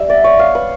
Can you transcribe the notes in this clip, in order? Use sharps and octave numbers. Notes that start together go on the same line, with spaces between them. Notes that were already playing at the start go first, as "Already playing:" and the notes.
Already playing: G3 E5
B3 D5
C#5
B3 F5
B4